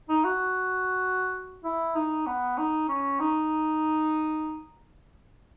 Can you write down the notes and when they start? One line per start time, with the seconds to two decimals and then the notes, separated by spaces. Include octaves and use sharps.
0.09 D#4
0.24 F#4
1.64 E4
1.95 D#4
2.27 B3
2.58 D#4
2.89 C#4
3.20 D#4